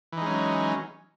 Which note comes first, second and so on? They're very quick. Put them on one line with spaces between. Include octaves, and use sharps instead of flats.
E3 D#4 G#3 C#4 F#3